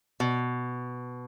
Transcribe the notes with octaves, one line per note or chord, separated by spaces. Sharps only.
B2